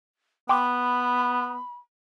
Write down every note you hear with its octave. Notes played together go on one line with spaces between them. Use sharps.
B3 G5 B5 C6 D6